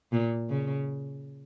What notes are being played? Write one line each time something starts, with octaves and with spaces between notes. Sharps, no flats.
A#2
C#3